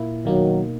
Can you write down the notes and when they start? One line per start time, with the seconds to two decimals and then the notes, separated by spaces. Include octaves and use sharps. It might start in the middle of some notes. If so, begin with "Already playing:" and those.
Already playing: A#2 A#3 E4
0.25 B2 D#3 F#3 A#3 D#4